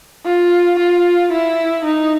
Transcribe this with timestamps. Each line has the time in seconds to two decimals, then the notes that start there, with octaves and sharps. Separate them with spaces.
0.26 F4
0.79 F4
1.32 E4
1.85 D#4